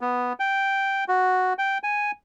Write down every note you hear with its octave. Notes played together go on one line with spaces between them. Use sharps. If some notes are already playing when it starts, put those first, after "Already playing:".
B3
G5
F#4
G5
G#5